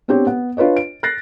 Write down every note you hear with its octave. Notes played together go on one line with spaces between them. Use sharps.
B3 C4 D4 G4 C#5
B3 F#5
D4 F4 B4 C#5 D#5
D7
F#6 A6 A#6 C7